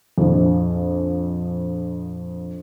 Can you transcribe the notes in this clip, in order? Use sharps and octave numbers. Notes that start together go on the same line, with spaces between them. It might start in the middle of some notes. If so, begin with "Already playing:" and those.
A#1 F2